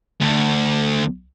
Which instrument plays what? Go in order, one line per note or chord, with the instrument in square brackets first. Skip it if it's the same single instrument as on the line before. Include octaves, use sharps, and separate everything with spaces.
[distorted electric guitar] D2